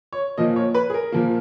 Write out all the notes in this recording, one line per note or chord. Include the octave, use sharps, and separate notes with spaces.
C#5
A#2 F3 A#3 D#5
C#5
B4
G#4
A#4
A#2 F3 A#3